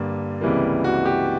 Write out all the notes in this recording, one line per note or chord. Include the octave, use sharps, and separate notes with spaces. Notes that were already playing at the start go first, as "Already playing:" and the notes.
Already playing: G2 D3 G3 A#3
C#2 C3 E3 G3 A#3
F#4
G4